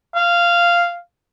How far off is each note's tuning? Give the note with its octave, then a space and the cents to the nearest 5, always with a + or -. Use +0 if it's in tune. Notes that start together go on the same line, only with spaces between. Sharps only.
F5 -10